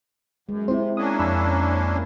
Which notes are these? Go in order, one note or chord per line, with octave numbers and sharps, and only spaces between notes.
F#2 G#3
C3 C4 E4 C5
A#3 C#4 D4 D#6
F2 B5 E6